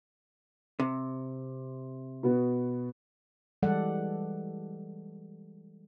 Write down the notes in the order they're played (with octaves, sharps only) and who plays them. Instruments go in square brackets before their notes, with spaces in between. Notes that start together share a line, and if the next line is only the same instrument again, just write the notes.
[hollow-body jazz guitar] C3
[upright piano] B2 B3 F#4
[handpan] E3 G3 G#3 A4 D5 F#5